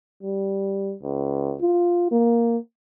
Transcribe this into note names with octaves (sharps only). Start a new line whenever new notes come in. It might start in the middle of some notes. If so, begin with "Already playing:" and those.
G3
C#2
F4
A#3